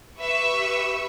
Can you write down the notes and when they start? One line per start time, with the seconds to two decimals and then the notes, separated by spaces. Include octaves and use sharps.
0.19 G4 B4 E5 C#6 E6